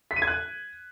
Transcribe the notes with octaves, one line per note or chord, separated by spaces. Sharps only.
B6
D#7
G#6
F#6